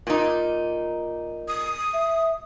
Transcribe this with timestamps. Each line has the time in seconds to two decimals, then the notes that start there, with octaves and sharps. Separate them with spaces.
0.07 A#2 D#4
1.48 D#6
1.93 E5